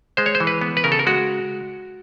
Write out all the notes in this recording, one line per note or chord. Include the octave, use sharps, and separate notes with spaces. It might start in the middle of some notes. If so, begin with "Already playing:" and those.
G#3 C5
C#5
C5
E3
B4
B3
B4
C#3 A#4
A4
A#4
G#3 F#4